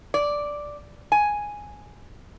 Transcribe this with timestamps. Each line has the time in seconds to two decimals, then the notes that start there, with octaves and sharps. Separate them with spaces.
0.14 D5
1.12 G#5